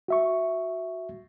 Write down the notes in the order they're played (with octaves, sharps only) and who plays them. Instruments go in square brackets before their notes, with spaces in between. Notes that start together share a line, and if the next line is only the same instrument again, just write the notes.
[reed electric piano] F#4 E5 C#6